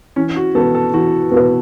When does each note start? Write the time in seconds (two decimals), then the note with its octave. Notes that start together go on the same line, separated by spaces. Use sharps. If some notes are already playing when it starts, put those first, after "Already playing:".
0.16 E3 C#4
0.36 F#4
0.55 B3 F#4 A4 B4
0.75 A4
0.93 E3 F#4
1.32 B3 F#4 B4